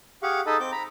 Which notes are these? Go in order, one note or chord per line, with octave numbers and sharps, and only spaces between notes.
G4 G#4 F5 F#5 C#6
D#4 G#4 A4 D#5 A5 B5
C4 D6 G6
A#5 B5